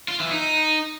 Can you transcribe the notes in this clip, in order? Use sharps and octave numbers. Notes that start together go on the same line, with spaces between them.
F4
E3
D#4